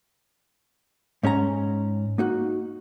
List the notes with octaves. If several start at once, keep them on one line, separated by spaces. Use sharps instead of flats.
G#2 C#4 A4 A#5
A#3 D#4 F#4